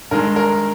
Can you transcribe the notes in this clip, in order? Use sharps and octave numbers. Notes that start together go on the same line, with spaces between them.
G2 D#3 G#3 A#4
A#4